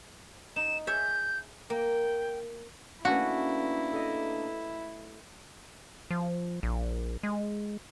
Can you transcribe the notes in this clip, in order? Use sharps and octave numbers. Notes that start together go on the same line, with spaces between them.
D#4 E7
G#4 C#5 E5 G6
A#3 G5
A3 A#3 C#4 D4 E4 F#4 B4
A4 D#5
F3
A#1
G#3